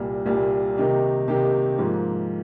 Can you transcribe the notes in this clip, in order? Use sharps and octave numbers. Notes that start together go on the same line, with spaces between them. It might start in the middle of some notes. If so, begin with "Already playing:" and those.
Already playing: C2 A#2 G3
C2 A#2 G3
C3 D#3 A#3 D#4 G4
C3 D#3 A#3 D#4 G4
G#2 F3 A#3